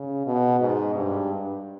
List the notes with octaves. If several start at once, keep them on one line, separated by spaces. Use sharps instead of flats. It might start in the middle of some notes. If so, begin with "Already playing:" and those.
Already playing: C#3
B2
G#2
G2